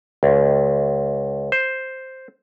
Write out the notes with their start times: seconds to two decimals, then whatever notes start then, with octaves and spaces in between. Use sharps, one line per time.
0.23 C#2
1.52 C5